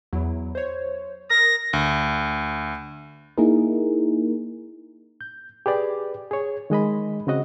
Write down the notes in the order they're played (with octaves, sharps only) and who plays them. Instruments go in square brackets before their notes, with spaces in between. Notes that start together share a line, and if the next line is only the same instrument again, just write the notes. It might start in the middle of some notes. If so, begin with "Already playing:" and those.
[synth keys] E2 F#3 E4
C5 C#5
[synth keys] A#4 D#6 [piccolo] A#6
[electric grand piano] D2
[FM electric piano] A#3 D#4 E4 G#4 A#4
[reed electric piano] G6
G4 G#4 B4 D5
G#4 C#5
D#3 G#3 D#5 B5
C#3 C4 F#4 D#5 F#5